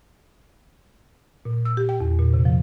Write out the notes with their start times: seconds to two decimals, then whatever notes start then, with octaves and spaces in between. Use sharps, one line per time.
1.45 A#2
1.65 E6
1.77 G4
1.89 G5
2.00 E2
2.19 A#2
2.34 C3
2.45 F3